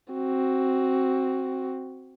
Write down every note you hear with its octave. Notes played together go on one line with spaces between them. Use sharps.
C4 F#4